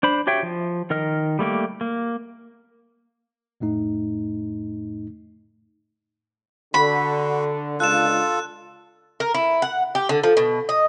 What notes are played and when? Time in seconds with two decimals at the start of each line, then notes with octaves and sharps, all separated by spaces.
0.03 D4 C5 B5
0.27 F#4 G4 C#5 E5 G5
0.43 F3
0.90 D#3 A#4 D#5 F6
1.39 G3 A3 A#3 G4
1.81 A#3
3.60 F2 A2 A3 D#4
6.74 D3 F#4 B5
7.80 C#2 D4 F4 A4 F5 F#6 E7
9.20 A#4
9.34 E4
9.62 F#5
9.95 G4
10.09 D3
10.23 F3
10.37 B2
10.69 D#5